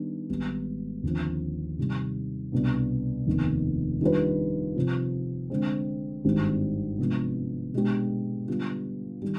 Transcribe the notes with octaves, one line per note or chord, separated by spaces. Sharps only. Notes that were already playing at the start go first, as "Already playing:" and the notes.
Already playing: D#3 G3 B3 D4
G#1 G#2 G3 B3
D#2 D3 F3 C4
C3 D#3 G3
C2 B2 B3 D4
F1 D#2 D#3 B3
D#3 G3 D4 F4 B4
C3 F3 C4
D3 G#3 C4
G#1 G2 D#3 G3 C4
C3 F3 G#3 B3 D4
B2 G#3 B3 D4 G4
D3 G3 B3 D4 F4
D#3 G3